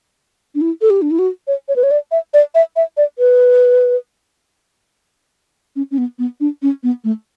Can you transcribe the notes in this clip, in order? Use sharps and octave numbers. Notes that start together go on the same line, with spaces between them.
D4
E4
A4
G4
D4
E4
F#4
C#5
C#5
B4
C#5
D5
E5
D5
E5
E5
D5
B4
C#4
C#4
B3
B3
D4
C#4
B3
A3